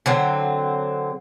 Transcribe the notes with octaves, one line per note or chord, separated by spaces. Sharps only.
D3 F#3 C4